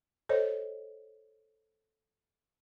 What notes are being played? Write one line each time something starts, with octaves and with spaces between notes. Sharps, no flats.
A4 C5 C#5 D#5